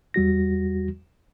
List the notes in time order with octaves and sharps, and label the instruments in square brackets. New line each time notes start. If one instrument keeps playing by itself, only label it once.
[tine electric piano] E2 G3 F#4 A#6